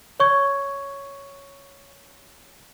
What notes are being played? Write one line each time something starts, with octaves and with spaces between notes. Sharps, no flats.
C#5 C#6 G#6